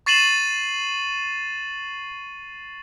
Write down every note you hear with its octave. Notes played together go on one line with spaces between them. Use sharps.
C#6 A6 C7 D#7 E7 F#7